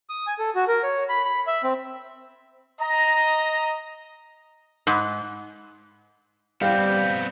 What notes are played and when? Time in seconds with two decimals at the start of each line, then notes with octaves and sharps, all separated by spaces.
0.09 D#6
0.27 G#5
0.39 A4
0.55 F#4
0.68 A#4
0.83 C#5
1.09 B5
1.25 B5
1.47 E5
1.64 C4
2.81 D#5 A#5
4.87 G#2
6.62 G3 B3 C4 F5 G5